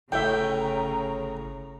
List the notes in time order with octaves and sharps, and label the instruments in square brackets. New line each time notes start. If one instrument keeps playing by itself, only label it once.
[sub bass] G1 [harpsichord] A2 [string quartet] C#3 A#5 [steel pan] E5 G5